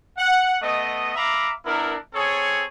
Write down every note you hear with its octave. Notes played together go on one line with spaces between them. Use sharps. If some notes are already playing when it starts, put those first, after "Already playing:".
F#5
A3 B3 D#5
E5 F5 A#5 B5 D6
B3 D4 E4 A#4
C4 G#4 A4 C#5